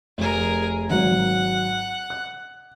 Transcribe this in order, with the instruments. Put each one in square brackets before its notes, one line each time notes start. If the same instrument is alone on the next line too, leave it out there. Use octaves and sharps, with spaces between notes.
[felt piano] F1 [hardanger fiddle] G#4 A#4
[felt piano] G#1 F#3 [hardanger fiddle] F#5
[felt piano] F#6